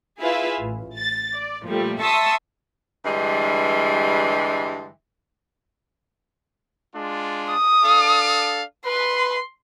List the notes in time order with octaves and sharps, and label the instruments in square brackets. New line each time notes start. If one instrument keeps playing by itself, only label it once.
[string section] E4 F4 G#4 B4 E5 F5
A1
A6
D5
A#2 F3 G3 A3
E5 A5 C6 C#6 D#6 E6
[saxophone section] G2 D3 E3 G3 G#3
[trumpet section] G#3 D4 F4
[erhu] D#6
[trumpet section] D4 A4 F5
[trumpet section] B4 [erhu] C6